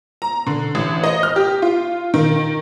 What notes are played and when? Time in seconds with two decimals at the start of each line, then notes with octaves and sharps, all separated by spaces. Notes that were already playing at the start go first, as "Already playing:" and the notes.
0.22 A#5
0.47 D3
0.75 A1
1.04 D#5
1.23 F6
1.36 G4
1.62 F4
2.14 D#3